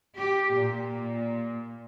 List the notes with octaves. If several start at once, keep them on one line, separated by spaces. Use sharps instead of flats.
G4
A#2